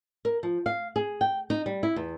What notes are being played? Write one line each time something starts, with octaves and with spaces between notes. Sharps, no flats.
A#4
F3
F5
G#4
G5
D#4
G3
E4
E2